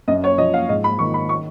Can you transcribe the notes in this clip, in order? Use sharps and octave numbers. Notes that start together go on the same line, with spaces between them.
F#2 D#5
C#5
F3 D#5
F5
G#2 D#5
B5
D#3 C#6
B5
C#6